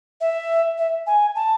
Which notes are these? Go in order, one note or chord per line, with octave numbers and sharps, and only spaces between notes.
E5
E5
G#5
A5